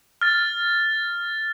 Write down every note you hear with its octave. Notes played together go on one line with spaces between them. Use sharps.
F6 A6